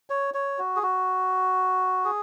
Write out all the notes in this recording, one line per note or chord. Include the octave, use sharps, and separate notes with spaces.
C#5
C#5
F#4
G#4
F#4
G#4